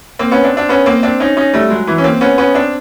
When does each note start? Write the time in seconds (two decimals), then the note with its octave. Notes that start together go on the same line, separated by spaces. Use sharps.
0.19 A#3 C4
0.31 B3 C#4
0.44 C4 D4
0.57 C4 D4
0.69 B3 C#4
0.86 A#3 C4
1.03 C4 D4
1.20 C#4 D#4
1.37 C#4 D#4
1.54 G3 A3
1.70 F#3 G#3
1.87 E3 F#3
1.98 C#4
2.04 A#3 C4
2.21 B3 C#4
2.38 B3 C#4
2.55 C4 D4